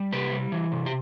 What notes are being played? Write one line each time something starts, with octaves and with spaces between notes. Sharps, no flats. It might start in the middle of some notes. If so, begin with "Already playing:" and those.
Already playing: G3
C3 G4 B4
G3
E3
C3
G4